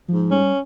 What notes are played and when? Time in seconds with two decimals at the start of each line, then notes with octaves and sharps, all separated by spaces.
0.08 G#2 F3
0.31 G3 C#4